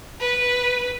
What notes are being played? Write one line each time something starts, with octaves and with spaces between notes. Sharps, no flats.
B4